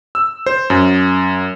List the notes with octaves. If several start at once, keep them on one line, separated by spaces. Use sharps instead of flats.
E6
C5
F#2